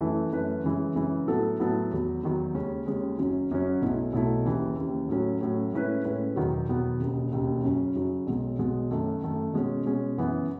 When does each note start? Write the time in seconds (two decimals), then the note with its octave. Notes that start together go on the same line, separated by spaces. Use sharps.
0.01 F#2 E3 A3 E4 B4
0.32 F#2 E3 A3 E4 B4
0.64 F#2 C#3 E3 G#3
0.95 F#2 C#3 E3 G#3
1.27 A2 F#3 B3 E4 A4
1.60 A2 F#3 B3 E4 A4
1.91 E2 D#3 F#3
2.23 E2 D#3 F#3
2.55 D#2 C#3 G#3 C#4
2.86 D#2 C#3 G#3 C#4
3.18 F#1 F#2 C#3 F#3 C#4
3.50 F#1 F#2 C#3 F#3 C#4
3.82 B1 B2 A3 E4
4.13 B1 B2 A3 E4
4.45 D#2 C#3 E3
4.77 D#2 C#3 E3
5.09 A2 F#3 C#4
5.41 A2 F#3 C#4
5.73 A2 G#3 C#4 E4 B4
6.04 A2 G#3 C#4 E4 B4
6.36 E1 E2 D#3 F#3 B3
6.68 E1 E2 D#3 F#3 B3
7.00 E1 D#2 C#3
7.32 E1 D#2 C#3
7.63 F#2 C#3 F#3 C#4
7.95 F#2 C#3 F#3 C#4
8.27 B1 B2 G#3
8.59 B1 B2 G#3
8.91 F#2 D#3 A3
9.23 F#2 D#3 A3
9.53 B2 G#3 C#4
9.86 B2 G#3 C#4
10.17 F#2 C#3 E3 B3